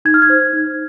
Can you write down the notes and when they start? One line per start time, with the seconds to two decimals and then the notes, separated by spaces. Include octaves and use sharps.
0.05 D#4 G#6
0.14 F6
0.22 G#6
0.29 C5
0.53 D#4